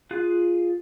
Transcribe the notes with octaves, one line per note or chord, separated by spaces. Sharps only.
F4 G#4 F5 F#6